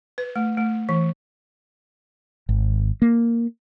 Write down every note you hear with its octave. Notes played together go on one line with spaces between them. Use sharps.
B4
A3
A3
E3
G#1
A#3